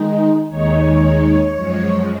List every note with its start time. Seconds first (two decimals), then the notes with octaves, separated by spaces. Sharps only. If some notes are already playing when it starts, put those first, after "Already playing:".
Already playing: D#3 G#3 D#4
0.50 D#2 D#3 G#3 D#4 C#5
1.56 F#2 F3 G#3